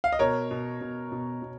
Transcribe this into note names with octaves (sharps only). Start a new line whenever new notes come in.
F5
D#5
B2 A#4 C#5
B2
B2
B2
B2